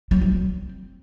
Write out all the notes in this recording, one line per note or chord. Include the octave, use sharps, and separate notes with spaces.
F#3
F#3
C4